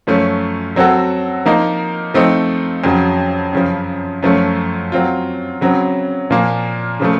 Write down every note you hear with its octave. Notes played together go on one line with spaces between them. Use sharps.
F#2 F3 A3 C#4
F#3 C4 F#4 A4
F3 A#3 D#4 A#4
F3 A3 C4 D#4
F2 C#3 F#3
F#2 C#3 F3
F#2 F3 A3 C#4
F#3 C4 F4
C#3 F#3 C4
A#2 F3 A#3
C#3 F3 A3